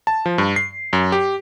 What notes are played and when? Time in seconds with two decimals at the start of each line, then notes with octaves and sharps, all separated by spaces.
0.07 A5
0.26 F3
0.38 G2
0.56 C7
0.93 F#2
1.12 G4